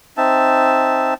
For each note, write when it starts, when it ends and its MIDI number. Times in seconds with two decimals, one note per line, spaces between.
0.17 1.14 60
0.17 1.14 63
0.17 1.14 76
0.17 1.14 81